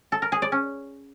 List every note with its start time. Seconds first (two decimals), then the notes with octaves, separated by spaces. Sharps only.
0.12 A4
0.22 A#4
0.32 G#4
0.42 D5
0.52 C#4